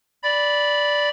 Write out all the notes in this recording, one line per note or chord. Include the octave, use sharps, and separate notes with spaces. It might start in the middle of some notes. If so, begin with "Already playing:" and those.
D5 B5